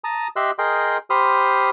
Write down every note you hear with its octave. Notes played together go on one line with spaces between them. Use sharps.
A5 A#5 D#6
G4 D#5 E5 C6 E6 F#6
G#4 A#4 D#5 G5 C6
G4 C5 B5 C6 D#6 F6